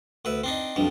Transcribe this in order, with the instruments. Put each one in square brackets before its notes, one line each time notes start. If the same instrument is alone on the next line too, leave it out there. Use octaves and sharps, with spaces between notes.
[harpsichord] D2 B4 E5
C4 D4 D#4
[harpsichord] B1 F2 G3 [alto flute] D4